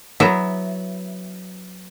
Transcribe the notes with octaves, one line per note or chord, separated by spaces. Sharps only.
F#3 B3 E4 E5